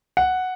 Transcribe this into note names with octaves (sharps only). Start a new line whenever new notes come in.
F#5